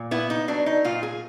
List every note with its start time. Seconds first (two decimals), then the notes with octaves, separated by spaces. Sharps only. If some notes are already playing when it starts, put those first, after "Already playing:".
Already playing: A#2
0.11 B3 E4
0.30 D#4
0.48 F#3 D4
0.66 D#4
0.85 A#2 F4
1.03 G#4